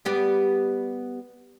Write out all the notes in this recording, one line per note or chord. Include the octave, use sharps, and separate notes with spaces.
G3 B3 G4